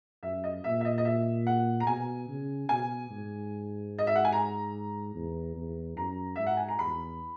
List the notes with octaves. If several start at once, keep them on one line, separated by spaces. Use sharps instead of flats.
F#2 E5
D#5
A#2 E5
E5
D#5
D#5
E5
F#5
A#5
B2 G#5
C#3
B2 G#5
G#2
D#5
E5
F#5
G#5
A#5
E2
E2
F#2 A#5
G#2 E5
F#5
G#5
A#5
E2 B5